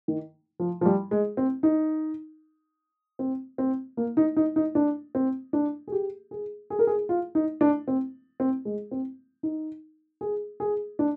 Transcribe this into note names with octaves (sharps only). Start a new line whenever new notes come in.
D#3
F3
F3
G3
G#3
C4
D#4
C4
C4
A#3
D#4
D#4
D#4
D4
C4
D4
G#4
G4
G#4
G#4
A#4
G#4
F4
D#4
D4
C4
C4
G#3
C4
D#4
G#4
G#4
D4